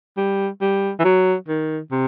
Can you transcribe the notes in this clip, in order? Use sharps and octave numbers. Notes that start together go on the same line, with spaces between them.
G3
G3
E3
F#3
D#3
C3